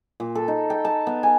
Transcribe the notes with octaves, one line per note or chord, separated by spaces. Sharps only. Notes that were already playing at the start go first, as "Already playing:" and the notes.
A#2
A4
D#4
G5
A5
B3
G#5